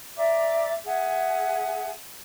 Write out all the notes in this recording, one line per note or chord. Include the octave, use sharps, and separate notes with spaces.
D5 E5 A#5 D6
G#4 E5 F#5 G#5